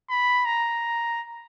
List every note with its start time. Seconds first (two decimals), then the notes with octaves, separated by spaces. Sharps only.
0.09 B5
0.45 A#5